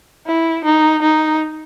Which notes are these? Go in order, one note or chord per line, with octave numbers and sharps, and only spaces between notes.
E4
D#4
D#4